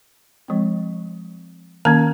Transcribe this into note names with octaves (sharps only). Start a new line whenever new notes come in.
F3 G#3 C4
D#3 A#3 C#4 A#5